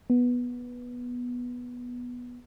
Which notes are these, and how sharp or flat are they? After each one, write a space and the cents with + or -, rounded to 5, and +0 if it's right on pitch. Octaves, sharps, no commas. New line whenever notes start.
B3 -10